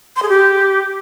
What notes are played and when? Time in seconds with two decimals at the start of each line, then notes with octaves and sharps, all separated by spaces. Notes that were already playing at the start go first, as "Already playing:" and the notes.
0.16 C6
0.23 G#4
0.29 G4